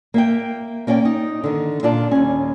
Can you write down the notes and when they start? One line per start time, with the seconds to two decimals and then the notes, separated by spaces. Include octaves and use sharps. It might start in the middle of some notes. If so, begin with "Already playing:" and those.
0.14 A#3 E5 G5
0.87 A#3 C#4 D5 F#5 G5
1.05 D#4
1.44 D3 D#3
1.83 A#2 D4 F4 D5 A5
2.11 D#2 G3 C#4